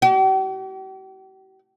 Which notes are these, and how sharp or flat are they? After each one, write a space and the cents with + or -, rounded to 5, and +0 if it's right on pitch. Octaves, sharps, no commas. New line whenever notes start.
G4 -45